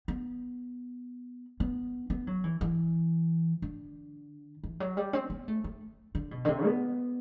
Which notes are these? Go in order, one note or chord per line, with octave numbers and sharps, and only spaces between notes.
B3
B3
B3
F#3
E3
E3
D3
E3
F#3
G3
C4
B3
A3
A3
D3
B2
D3
C3
B3